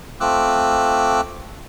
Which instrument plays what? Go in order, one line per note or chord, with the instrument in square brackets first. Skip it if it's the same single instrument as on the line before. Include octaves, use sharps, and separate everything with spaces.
[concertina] A3 C4 F4 D6 E6 F#6